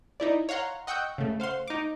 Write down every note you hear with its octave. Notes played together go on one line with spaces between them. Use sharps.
D#4 E4 D5
C#5 F5 F#5 A#5 C6
D#5 F#5 G5 C#6 E6 G6
C#3 A3
C5 F5 F#5 C6
D#4 D6